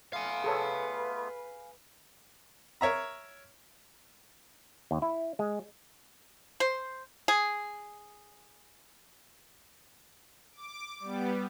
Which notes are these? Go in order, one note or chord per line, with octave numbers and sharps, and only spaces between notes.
A3 B3 F4 F5 G#5
G#4 A4 B4 C#5
A#4 C#5 E5 A#5
D#2
E4
G#3
C5
G#4
D6
G3 B3